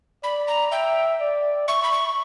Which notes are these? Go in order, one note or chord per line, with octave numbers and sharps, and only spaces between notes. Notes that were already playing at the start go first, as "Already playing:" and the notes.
D5 B5
A#5
E5 G5
D5
E5 C#6
B5
C#6